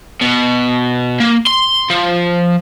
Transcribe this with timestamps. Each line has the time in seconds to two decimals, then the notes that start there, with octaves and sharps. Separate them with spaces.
0.21 B2
1.20 A#3
1.47 C6
1.90 F3